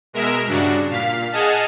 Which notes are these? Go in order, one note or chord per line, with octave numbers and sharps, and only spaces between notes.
B2 G#3 A#4 E5
G2 C#3 D4 F#4
A#2 F5 B6
G#4 D#5 F#5 G#5 A5 F6